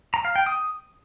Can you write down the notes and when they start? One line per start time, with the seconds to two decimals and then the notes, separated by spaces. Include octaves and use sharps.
0.14 A#5
0.25 F5
0.36 G5
0.46 D#6